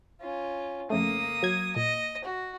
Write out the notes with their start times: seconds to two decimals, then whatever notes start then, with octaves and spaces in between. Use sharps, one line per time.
0.22 C#4 F4
0.90 F2 C#3 A3 A#3 D#6
1.43 F#3 G#6
1.76 A#2 D#5
2.25 F#4